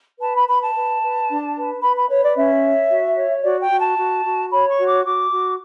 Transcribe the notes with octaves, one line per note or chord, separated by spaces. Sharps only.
B4 A5
B5
B4 B5
A5
B4
B4
D4
B4
B4 B5
B5
B4 C#5
D5
C#4 E5
C#5
F#4
C#5
F#4 D5
G5
F#4
A5
F#4
F#4
C#5 B5
C#6
F#4
D6
F#4 D6
F#4